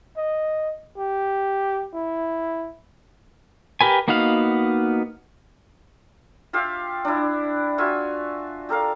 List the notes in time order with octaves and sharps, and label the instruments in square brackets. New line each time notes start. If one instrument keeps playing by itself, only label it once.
[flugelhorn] D#5
G4
E4
[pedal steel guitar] G4 A#4 B4 G#5
A#3 B3 D#4 F#4 F5
[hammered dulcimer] F4 G4 E5 F5
D4 E4
F4 F#4 E5 G#5
G4 A4 A#4 F5